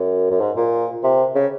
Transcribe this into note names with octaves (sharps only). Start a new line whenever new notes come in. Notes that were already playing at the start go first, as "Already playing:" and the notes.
Already playing: F#2
F#2
G#2
A#2
C3
C#3